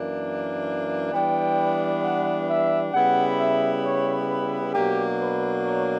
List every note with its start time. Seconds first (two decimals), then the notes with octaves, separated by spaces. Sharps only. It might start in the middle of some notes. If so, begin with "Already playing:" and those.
Already playing: F#2 E3 A#3 D4
1.12 E3 G3 B3 D4 G5
2.02 F#5
2.48 E5
2.93 C#3 G3 B3 E4 F#5
3.38 E5
3.84 C#5
4.29 B4
4.73 B2 F#3 A#3 D4 G4
5.19 B4
5.64 C#5